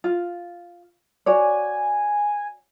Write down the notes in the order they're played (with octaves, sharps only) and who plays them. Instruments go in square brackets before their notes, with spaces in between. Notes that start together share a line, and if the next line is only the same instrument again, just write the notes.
[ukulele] F4
[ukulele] F#4 C#5 D5 [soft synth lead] G#5